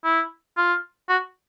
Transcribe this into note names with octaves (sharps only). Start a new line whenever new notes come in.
E4
F4
F#4